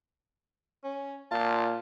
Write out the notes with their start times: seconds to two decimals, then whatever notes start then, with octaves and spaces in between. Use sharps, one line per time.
0.84 C#4
1.31 A#2 F4 A5